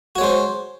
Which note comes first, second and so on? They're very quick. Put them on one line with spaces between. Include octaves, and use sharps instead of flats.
F#4 C#5 G#3 C5